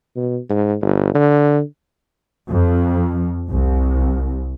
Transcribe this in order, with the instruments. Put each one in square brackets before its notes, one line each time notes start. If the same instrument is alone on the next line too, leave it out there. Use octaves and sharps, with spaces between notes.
[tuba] B2
G#2
G1
D3
[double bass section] F2
C2